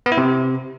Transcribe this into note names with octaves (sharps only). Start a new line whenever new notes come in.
B3
E4
C3